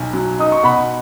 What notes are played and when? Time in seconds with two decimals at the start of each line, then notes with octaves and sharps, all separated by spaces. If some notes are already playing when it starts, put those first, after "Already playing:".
Already playing: B1 G#5
0.13 F#3
0.39 D#4 D#6
0.52 C#6
0.63 B2 F#5 B5